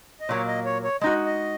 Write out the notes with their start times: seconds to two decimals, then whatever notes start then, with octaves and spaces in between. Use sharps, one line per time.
0.20 D#5
0.29 A#2 F#3 A#3 C#5
0.47 D#5
0.65 C#5
0.84 C#5
1.01 G#3 D#4 F#4 D#5
1.26 D#5